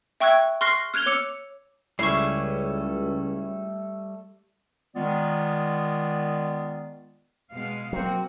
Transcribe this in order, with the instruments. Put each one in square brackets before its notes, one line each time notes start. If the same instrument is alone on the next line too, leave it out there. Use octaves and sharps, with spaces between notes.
[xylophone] E5 G5 C#6 E6 F#6 G#6
C6 C#6 F6 F#6 A#6 C7
F6 F#6 G#6 F7 G7
C#5 D6 E6 C#7 F7
[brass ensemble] C#2 [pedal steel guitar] G3 A3 [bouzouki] C#4 E4 [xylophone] C#6 C7
[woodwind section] D#3 G#3 B3 F4 D5
[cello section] B2 G#3 F5
[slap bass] F#3 [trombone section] A#3 C4 [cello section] F#4